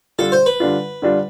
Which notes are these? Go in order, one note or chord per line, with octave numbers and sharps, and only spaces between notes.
D3 G3 D4 F4 A4
C5
B4
D3 G3 D4 F4
D3 G3 D4 F4